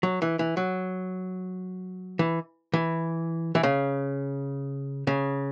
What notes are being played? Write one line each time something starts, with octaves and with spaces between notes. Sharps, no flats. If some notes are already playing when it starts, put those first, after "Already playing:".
F#3
E3
E3
F#3
E3
E3
E3
C#3
C#3